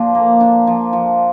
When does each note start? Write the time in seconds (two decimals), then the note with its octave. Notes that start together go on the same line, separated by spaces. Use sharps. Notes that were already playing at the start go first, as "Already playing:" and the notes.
Already playing: A#2 F3 D4
0.15 A#3
0.41 D4
0.67 F3
0.93 F3